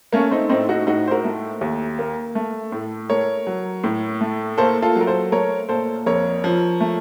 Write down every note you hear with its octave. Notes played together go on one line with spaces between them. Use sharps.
A3 A#3 C#4
C4 D#4
A2 C4 D#4
D#4 F#4
A2 D#4 F#4
C5
F#4 A#4
A3
D#2
A#3
A3
A2
A3 A#4 C#5
F#3
A2
A3
A#3 A4 C5
F4 A4
F#3
A#4
A4 C5
A3 A#4 C#5
A#2 A4 C5
F2 A#4 C#5
F3
A3